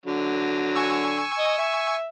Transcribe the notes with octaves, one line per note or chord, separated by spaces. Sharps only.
D3 F#3
G#5 C#6 E6
D#5
E5